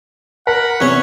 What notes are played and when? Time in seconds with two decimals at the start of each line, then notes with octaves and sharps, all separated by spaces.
0.47 A#4 F#5 B5
0.80 E2 C3 C#4 C#5